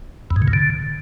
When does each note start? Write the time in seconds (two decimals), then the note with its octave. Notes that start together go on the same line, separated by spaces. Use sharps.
0.31 E2
0.36 G#2
0.42 C#3
0.48 A#2
0.53 D3